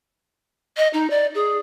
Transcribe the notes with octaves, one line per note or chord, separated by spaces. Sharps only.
D#5
D#4
D5
G#4